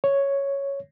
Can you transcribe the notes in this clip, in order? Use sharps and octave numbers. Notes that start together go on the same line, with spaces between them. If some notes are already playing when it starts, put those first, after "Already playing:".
C#5